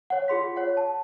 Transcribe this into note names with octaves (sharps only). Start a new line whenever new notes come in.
C#5 F#5
F4 G#4 C6 B6
C#5 F#5
A5